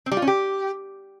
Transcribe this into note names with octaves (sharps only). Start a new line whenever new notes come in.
C4
G3
F4
C#4
G4